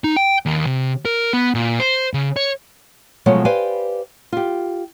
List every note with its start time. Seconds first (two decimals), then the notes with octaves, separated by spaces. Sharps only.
0.04 D#4
0.17 G5
0.46 D#2
0.67 C3
1.05 A#4
1.33 B3
1.55 A#2
1.80 C5
2.14 C#3
2.36 C#5
3.26 B2 F3 F#3 G#3 A3 C#5
3.45 G4 B4 C5 D5 F5 G#5
4.32 F4 G4